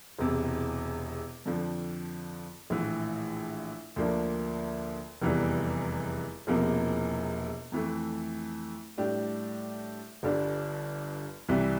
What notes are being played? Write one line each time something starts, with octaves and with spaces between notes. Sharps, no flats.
E1 E2 C3
F2 D3 F3
A#1 A2 E3
D2 D3 F3 A#3 D4
F1 E2 E3 G3
E1 E2 C3 F3 A#3
F2 E3 A3
A2 G3 D4 G4
G1 G2 D3 G3 D4
C2 C3 E3 G3